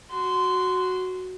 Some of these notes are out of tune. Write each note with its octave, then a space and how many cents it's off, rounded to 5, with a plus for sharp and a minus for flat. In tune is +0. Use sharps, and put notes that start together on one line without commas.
F#4 +0 C6 -15